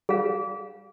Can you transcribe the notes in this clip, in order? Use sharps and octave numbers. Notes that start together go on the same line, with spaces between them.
G3 G#4 F5